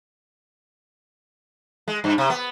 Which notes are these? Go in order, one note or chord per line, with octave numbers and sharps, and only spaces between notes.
G#3
G2
C3
B3